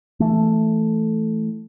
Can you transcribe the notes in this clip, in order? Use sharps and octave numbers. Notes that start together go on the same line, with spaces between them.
E3 A3